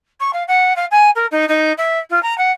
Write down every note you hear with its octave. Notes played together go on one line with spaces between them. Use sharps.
C#6
F5
F#5
F5
G#5
A#4
D#4
D#4
E5
F4
A#5
F#5